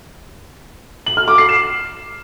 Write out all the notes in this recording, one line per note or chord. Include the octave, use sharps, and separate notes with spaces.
F#7
F6
D6
C7
E7